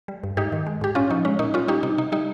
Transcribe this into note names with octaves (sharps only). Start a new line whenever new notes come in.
G3
G2
G#2 D#4 G4
D#3
G#3
G#2 G4
A#2 C#4 F4
F3 D#4
G#3 C#4
A#2 D#4
G3 C#4 F4
G3 D#4 G4
C3 D#4
C3 D#4
G3 D#4